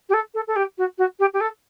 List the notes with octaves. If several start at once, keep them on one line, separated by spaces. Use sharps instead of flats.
G4
A4
A4
A4
G4
F#4
F#4
G4
G4
A4